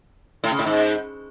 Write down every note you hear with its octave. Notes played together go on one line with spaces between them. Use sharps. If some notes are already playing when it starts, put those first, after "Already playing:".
A2
C#3
A2
G#2